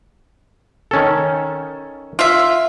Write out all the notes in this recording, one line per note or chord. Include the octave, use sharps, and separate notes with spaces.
D#3 C#4 A4
F4 E5